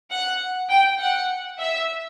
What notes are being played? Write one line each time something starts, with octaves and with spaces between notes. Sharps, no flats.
F#5
G5
F#5
E5